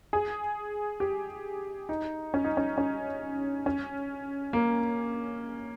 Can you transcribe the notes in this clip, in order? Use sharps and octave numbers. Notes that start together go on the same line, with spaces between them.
G#4
G4
D#4
C#4
D#4
C#4
C#4
C#4
A#3